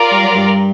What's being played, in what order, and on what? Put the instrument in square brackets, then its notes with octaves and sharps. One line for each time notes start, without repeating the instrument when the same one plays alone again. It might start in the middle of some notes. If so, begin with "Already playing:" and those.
Already playing: [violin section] F4 A#4 D5
[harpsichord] G3
F#3
G2 G3